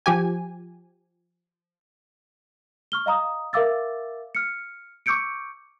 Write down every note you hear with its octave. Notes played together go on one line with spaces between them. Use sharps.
F3 G4 G#5
C#6 F6 G7
D#5 F5 A#5 D#6
A#4 E5 F5 D6 E6 A6
F6 C#7
C#6 D6 E6 G6 C#7 D7